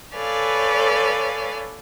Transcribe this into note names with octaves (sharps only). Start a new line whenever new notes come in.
A4 B4 C#5 D5 F5 G#5